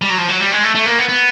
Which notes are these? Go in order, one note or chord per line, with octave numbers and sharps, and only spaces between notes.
G3
F#3
F3
F#3
G3
G#3
A3
A3
A#3
B3
B3